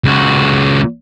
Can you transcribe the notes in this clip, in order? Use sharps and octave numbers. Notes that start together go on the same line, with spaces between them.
C#2 F#4